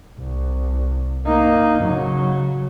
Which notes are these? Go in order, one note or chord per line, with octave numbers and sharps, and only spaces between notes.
C2
A#3 D#4
C#3 F#3